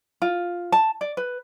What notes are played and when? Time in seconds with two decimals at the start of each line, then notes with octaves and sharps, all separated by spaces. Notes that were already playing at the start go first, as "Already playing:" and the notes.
0.22 F4
0.72 A5
1.01 D5
1.17 B4